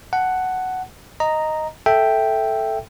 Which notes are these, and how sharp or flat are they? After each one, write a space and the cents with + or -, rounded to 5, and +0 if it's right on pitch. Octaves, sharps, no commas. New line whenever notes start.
F#5 +5 A5 -10
D#5 +0 A#5 -5
A4 +0 E5 +0 G5 +0